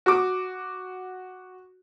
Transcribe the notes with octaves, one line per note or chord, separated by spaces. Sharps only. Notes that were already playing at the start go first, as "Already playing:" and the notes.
F#4 D6